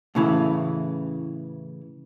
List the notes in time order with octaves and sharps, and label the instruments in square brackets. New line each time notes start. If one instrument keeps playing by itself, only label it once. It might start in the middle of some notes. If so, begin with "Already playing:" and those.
[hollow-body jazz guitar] A2 C#3 E3